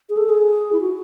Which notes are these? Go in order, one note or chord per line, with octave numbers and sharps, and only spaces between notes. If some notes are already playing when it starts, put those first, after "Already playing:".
G#4
A4
G#4
E4
F#4